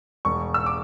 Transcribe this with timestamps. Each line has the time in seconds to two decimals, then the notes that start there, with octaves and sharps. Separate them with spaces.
0.25 E1 C#6
0.54 E6
0.66 D6